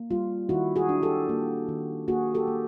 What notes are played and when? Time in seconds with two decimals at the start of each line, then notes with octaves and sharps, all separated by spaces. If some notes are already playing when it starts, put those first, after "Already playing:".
Already playing: A#3
0.11 G3 F4
0.49 D#3 E4 F#4
0.76 F#4 G#4
0.89 D4
1.02 G4 A4
1.29 A#3
1.69 D#3
2.08 A#3 F#4 G#4
2.35 G4 A4
2.47 A#3